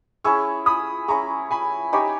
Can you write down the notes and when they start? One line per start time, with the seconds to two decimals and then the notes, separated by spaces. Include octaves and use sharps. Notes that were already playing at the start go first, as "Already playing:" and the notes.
0.24 C#4 E4 G#4 C#6 E6
0.66 B5 D#6
1.08 C#4 E4 G#4 A#5 C#6
1.51 G#5 B5
1.93 D#4 G4 C#5 E5 G#5 B5